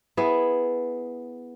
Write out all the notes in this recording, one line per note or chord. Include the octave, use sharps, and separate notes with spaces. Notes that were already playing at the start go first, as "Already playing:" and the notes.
B3 E4 G#4